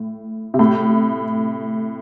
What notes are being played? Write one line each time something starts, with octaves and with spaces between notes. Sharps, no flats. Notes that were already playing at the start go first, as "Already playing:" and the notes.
Already playing: A2
C3
A2